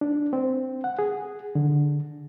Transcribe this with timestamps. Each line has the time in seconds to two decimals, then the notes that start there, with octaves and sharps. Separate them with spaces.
0.01 D4
0.33 C4
0.84 F#5
0.99 G#4
1.55 D3